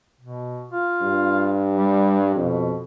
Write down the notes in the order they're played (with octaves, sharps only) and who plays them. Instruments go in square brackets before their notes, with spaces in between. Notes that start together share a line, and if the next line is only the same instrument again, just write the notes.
[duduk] B2
F4
[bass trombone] G2
[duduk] G3
[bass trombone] F2 [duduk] B2